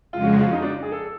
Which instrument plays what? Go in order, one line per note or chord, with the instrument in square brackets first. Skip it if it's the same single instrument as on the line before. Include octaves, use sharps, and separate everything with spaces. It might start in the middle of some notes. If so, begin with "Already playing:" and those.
[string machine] F2 C#3 F3 G#3 [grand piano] F4
[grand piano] F#4
F#4
F4
D#4
D4
G#4
A4